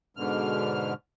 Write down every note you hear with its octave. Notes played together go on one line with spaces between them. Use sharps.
G#2 B2 D3 F6